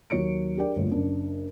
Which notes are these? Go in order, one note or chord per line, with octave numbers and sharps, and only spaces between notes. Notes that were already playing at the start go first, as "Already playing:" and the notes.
D#2 F#3 C#5 C#7 D7
D4 G4 G#4 A#4 D5 G5
G1 D2 A#2 C#5
F#1 D4